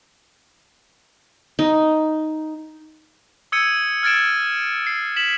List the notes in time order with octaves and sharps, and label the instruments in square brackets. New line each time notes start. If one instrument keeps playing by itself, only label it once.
[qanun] D#4
[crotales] D#6 E6 G#6 C#7 D#7
F6 G#6 A6 D7 E7
C7
B6 E7 F#7